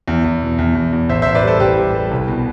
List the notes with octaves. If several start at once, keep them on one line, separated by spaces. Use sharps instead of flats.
E2
E2
B2
E2
E2
E2
A1 C5 E5
A1 C5 E5
B4 D5
G3 A4 C5
A1 G4 B4
G3
G3
C2
B2